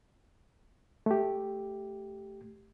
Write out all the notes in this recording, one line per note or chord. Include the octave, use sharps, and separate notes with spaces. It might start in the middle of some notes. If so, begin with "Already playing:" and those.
A3 G4